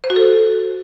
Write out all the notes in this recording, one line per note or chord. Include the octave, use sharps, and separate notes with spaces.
C5
F#4
A4